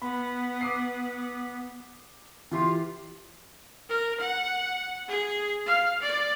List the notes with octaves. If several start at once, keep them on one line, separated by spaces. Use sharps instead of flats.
B3 B5
D6 D#6 C7
E3 F4 G4 C6
A#4
F#5
G#4
F5
D5